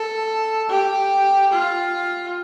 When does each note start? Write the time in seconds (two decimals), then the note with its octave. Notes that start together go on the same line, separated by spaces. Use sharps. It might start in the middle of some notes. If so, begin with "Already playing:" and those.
Already playing: A4
0.69 G4
1.53 F4